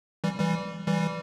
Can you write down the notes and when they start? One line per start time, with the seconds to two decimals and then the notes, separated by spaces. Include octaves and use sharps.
0.24 E3 G3
0.40 E3 G3
0.87 E3 G3